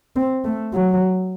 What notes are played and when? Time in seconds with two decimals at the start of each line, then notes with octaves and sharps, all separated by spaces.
0.16 C4
0.45 A3
0.73 F#3